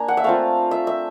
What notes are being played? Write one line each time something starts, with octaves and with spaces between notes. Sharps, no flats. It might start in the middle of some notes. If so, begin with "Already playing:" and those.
Already playing: A#3 D4 G#5 A#5
F#5
E5
A3 C4 F4 F5
E5
E5